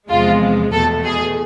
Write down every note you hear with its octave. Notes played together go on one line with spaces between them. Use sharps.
E2 C3 F3 G#3 F4
E2 B2 A3 A4
G#4